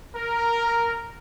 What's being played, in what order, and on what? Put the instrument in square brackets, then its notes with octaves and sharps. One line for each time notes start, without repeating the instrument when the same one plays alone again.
[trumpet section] A#4